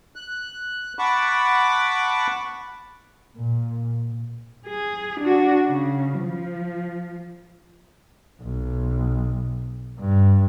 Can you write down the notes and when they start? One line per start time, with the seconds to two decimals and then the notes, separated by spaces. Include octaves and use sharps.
0.16 F#6
0.99 F#5 A5 B5 C#6 D6
3.37 A#2
4.66 G#4
5.20 D4 F#4
5.69 C#3
6.21 F3
8.42 B1
10.00 G2